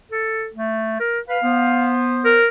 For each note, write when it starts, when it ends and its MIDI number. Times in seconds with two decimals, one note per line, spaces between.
0.12 0.48 69
0.54 0.99 57
1.00 1.20 70
1.29 1.38 71
1.29 1.93 77
1.43 2.39 59
1.43 2.39 72
2.24 2.48 70